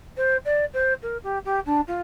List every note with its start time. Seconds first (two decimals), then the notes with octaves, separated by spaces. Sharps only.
0.17 C5
0.45 D5
0.74 C5
1.02 A#4
1.23 G4
1.45 G4
1.66 D4
1.87 F4